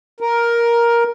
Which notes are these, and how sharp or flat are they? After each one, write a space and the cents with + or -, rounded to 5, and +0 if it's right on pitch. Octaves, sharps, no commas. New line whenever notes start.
A#4 +10